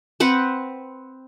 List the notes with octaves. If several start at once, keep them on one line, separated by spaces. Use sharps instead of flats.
C4 B4 F#5